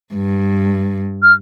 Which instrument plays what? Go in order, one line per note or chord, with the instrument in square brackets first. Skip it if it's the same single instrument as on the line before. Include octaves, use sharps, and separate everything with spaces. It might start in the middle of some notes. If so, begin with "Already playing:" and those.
[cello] G2
[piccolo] F6